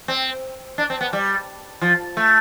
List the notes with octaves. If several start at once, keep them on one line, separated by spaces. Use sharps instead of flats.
C4
D4
C4
B3
G3
F3
A3